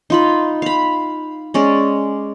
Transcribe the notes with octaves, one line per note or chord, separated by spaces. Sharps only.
D#4 F4 B5
F5 B5
G#3 C#4 D5